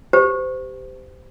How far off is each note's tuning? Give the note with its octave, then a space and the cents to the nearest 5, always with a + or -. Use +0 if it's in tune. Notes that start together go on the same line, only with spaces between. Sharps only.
G4 +0 C5 -30